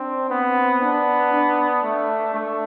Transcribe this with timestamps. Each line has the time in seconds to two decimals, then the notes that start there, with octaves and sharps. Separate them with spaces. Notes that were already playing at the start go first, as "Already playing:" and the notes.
Already playing: C4 D4
0.30 B3 C4
0.81 B3 D4
1.33 D4
1.84 A3
2.34 A3